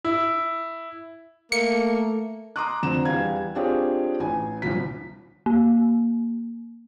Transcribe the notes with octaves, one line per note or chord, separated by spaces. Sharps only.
E4
A3 A#3 C#7
A#5 C6 D6 D#6 F#6
F2 D3 C4 A#5 E7
E2 G3 F5 G#6
C4 D4 F4 G4 G#4 C#5
A1 G#5
D#1 C2 D3 F3 B6
A#3